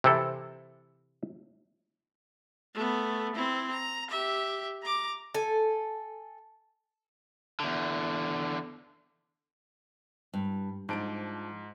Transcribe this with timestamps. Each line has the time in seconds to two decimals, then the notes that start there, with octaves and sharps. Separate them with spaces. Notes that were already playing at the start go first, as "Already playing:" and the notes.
0.04 C3 E3 C4 E4 A4
2.74 A3 B3
3.35 C4 E4
3.71 A#5
4.10 G4 E5
4.83 A#5 D6
5.34 A4 G#5
7.60 E2 D3
10.34 G2
10.89 G#2 F3 D4 A5 D7